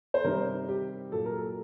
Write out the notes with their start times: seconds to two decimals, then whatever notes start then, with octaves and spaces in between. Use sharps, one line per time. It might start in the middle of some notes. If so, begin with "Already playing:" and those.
0.14 C5
0.24 C3 D#3 G3 A#4
0.68 G4
1.12 A#2 F#3 A4
1.26 A#4
1.39 A4